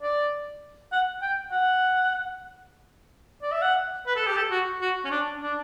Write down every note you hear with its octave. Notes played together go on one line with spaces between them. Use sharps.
D5
F#5
G5
F#5
D5
E5
F#5
B4
A4
G4
A4
F#4
F#4
C#4
D4
D4